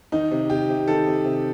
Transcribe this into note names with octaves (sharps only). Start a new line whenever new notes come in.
D#3 D#4
C3
C3 G4
C3
D#3 A4
C3
C3